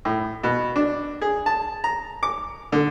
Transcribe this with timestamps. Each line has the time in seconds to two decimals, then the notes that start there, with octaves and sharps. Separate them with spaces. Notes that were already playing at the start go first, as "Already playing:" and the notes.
0.05 A2
0.43 B2
0.76 D4
1.21 G#4
1.46 A5
1.84 A#5
2.23 D6
2.72 D3